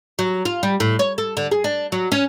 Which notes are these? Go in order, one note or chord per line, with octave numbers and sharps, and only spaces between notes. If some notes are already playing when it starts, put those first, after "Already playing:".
F#3
F4
G3
A2
C#5
A4
D3
G#4
D4
F#3
C#4